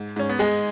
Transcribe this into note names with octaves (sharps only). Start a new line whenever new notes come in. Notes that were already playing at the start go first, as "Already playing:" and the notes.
Already playing: G#2
G#2 C#4
B3
G#3 G#4